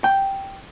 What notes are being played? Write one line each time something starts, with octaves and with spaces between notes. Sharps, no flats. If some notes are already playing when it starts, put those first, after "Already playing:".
G5